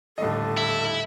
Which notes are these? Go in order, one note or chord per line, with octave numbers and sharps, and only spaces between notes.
D#1 A2 D3 A4 D#5
E4 E5